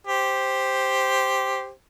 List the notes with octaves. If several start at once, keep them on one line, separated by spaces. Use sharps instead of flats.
G4 C5